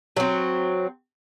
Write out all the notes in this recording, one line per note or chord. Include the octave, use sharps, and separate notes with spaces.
F#3 C4